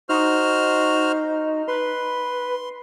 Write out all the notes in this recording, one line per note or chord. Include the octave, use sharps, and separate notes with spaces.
D#4 F#4 C5 F6
B4 C6